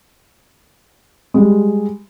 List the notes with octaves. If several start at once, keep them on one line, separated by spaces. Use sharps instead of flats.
G3 G#3